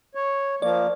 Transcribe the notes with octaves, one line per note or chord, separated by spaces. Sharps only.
C#5
F3 A#3 D5